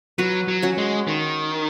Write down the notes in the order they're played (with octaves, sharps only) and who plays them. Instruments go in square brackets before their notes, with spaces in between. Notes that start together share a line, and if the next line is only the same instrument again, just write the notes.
[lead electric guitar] F#3 [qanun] F#4 B4
[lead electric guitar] F#3
[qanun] C#4 F#4
[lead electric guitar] G#3
D#3